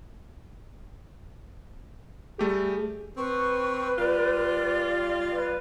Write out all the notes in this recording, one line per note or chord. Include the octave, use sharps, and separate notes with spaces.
G3 A3 G4 G#4
C4 B4 C#6
G3 F4 D5
B4